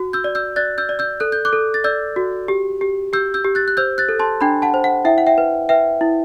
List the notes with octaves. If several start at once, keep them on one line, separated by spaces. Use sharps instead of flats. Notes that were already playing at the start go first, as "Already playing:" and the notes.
Already playing: F#4
E6 G6
D5
E6 G6
D5 F#6 A6
E6 G6
D5
E6 G6
A4 F#6
G6
D6 F#6
A4
A6
D5 E6 G6
F#4
G4
G4
G4 E6 G6
E6 G6
G4
F#6 A6
F#6
C5 E6 G6
F#6 A6
A4
A5 C6
D4 G5 B5
F#5 A5
C5
F#5
E4 E5 G5
F#5
E5 G5
B4
B4 E5 G5
E4